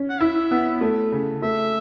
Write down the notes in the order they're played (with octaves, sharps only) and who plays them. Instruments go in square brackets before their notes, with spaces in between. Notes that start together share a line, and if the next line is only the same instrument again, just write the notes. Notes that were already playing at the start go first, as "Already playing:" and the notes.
Already playing: [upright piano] C#4
[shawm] F#5
[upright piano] E4 [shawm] E5
[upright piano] B3
A3
C#3
[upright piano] A3 [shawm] E5